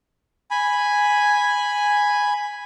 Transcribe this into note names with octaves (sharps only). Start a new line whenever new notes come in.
G#5 B5